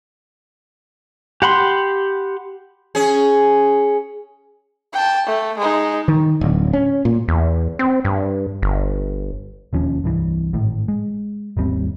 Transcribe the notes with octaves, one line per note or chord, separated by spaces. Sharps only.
G4 F#5 B5 C6
C#4 G#4
G5 A5
A3
G#3 D#4
D#3
D1
C#4
A#2
E2
C4
G2
G1
E1 D#2 F3 C#4
C2 G2 E3
G#1 A2
G#3
G#1 D#2 G3 C4